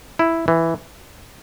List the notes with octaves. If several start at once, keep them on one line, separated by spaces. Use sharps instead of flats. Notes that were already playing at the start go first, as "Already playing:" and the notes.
E4
E3